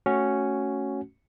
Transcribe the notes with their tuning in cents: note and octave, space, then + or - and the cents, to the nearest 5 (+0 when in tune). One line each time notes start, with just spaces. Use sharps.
A3 +0 C#4 +0 F#4 +5